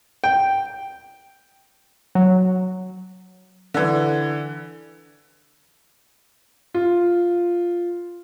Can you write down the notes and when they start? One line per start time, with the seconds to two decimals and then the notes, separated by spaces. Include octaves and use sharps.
0.24 G5
2.15 F#3
3.74 D3 E3
6.74 F4